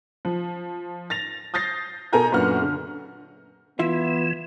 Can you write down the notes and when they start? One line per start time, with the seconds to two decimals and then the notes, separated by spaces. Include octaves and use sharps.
0.25 F3
1.10 A6 A#6 F7
1.54 D#6 G6 A6 A#6 C7
2.13 B2 A4 A#4 G#5 A#5 G6
2.32 F#2 A#2 B3 D4 F#4 F6
2.62 D3
3.79 E3 B3 E4 F4 E5